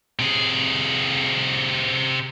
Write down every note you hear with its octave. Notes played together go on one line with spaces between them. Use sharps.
C3 G#4